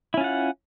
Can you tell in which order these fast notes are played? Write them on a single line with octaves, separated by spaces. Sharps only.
E4 C#4 F4 F#5